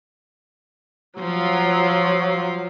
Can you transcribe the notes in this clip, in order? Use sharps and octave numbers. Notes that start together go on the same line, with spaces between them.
F3 F#3 F4